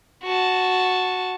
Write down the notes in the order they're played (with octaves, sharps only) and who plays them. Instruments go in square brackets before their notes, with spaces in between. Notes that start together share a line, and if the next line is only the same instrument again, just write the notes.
[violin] F#4 A5